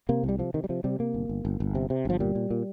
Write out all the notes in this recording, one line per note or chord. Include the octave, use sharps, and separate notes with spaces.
C3 A#3
C2
G3
C3 F3
C3 D#3
G3
C3 F3
C3 G3
C3 A#3
G1
G1
G1
G1
C3
C3
G1 F3
A#2 G3
A#2
A#2